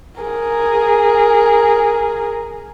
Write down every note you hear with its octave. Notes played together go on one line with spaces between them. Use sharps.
G#4 A#4